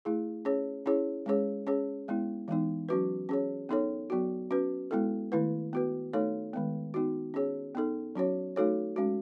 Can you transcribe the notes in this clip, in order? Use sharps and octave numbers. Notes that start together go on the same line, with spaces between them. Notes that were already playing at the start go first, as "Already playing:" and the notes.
A3 E4 G#4
C#4 G#4 C#5
C#4 E4 G#4 C#5
G#3 C#4 G#4 C#5
C#4 G#4 C#5
G#3 B3 E4
E3 G#3 B3 D#4
F#3 C#4 F#4 B4
C#4 G#4 C#5
B3 D#4 A4 C#5
F#3 B3 F#4
C#4 F#4 B4
G#3 B3 E4 A4
D#3 A3 E4 B4
B3 F#4 B4
A3 D#4 A4 C#5
D#3 G#3 B3
B3 D#4 F#4
C#4 G#4 C#5
B3 D#4 A4
F#3 C#4 F#4 C#5
A3 D#4 F#4 A4 C#5
G#3 C#4 F#4